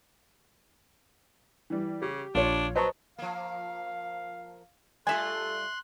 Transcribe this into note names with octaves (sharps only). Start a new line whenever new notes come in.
E3 G3
C#3 G4
A#1 D4 F4 C#5
F#3 B4 C5 D#5 A5 A#5 C#6
F3 A#3 F5
G3 A3 F4 A4 E5 G#5 C6 F#6